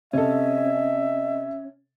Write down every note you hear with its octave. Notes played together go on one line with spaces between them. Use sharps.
C3 C#4 A4 D#5 E5